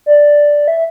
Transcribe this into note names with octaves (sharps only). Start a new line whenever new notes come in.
D5
E5